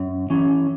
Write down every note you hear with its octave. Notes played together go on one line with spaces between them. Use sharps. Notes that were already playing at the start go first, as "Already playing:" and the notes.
Already playing: F#2
E3 C#4